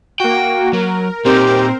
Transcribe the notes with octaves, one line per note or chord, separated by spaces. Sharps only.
A#3 F#4 G5
F#3 A#4
A#2 C4 D#4 G4 A#4 C5